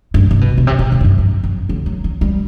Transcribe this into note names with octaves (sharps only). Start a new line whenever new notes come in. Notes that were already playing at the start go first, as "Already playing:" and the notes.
G2
C3
B2
B2
C3
B2
B2
G2
F#2
F#2
F#2
D3
F#3
F#3
G3